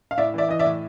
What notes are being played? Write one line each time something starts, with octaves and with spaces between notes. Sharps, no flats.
F5
A2 D5 E5
E3 D5 E5
E3 D#5
D5 E5
A2